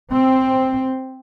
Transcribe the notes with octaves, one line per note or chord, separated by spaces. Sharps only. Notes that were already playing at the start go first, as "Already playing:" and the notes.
C4